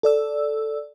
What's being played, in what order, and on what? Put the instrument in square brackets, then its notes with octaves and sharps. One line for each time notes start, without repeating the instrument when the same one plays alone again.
[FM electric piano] A4 D5 E6